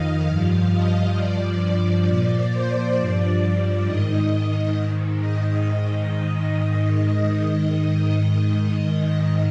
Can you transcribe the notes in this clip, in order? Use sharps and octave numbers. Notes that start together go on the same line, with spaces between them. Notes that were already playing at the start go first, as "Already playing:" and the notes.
Already playing: F2 D#3 D#5 F5
G2 F3
D#5
G2 F3 D5
D5
A#2 F3
C5
G2 F3 D5
D5
G#2 D#3 D#5
G#2 D#3
D#5